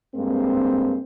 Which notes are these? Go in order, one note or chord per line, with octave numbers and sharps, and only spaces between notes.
G2 G#3 A#3 C4